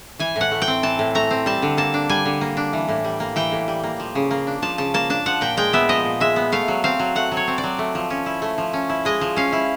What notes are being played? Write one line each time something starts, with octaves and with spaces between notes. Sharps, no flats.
E3 G#5
A2 F#5
A3
G5
C4
E3 A5
A2
A3 A#5
C4
G3 A5
D3
A#3 A5
D4
G3 G#5
D3
A#3
D4
E3
A2
G3
A#3
E3 G5
A2
G3
A#3
F3
C#3
A#3
D4
F3 A5
C#3 A5
A#3 A5
D4 A5
F3 F#5
A#2 G5
G#3 G5
B3 E5
F3 D#5
A#2
G#3 E5
B3
A3 F5
F#3
C4 F5
F#3
A3 F#5
F#3
C#5
C4
D5
F#3
A3
F3
C#4
E4
A3
F3
C#4
E4
G#3 D#5
F3
C#4 F5
E4